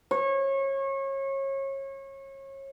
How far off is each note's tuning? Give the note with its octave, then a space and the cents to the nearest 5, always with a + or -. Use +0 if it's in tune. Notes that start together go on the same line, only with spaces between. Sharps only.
C#5 -30